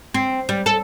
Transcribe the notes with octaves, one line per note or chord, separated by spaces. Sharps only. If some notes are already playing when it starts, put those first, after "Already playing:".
C4
G3
A4